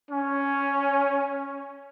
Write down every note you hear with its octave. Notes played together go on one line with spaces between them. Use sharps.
C#4